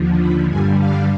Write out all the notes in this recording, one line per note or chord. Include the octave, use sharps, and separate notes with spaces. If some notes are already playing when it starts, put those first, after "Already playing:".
Already playing: D#2 D3 F3
B5
G2 D3 G3 G#5
F5